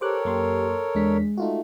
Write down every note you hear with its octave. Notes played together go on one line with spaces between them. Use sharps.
G4 A4 A#4 C5 C#5 D6 F#6
F#2 A#3 C6
E2 G#3 D4 B6
A3 D#4 F4 F#4